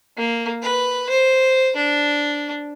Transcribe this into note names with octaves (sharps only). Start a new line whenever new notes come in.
A#3
B4
C5
D4